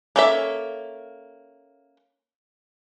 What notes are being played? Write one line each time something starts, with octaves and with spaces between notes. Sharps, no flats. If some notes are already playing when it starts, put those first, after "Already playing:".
A#3 C#4 A4 C#5 E5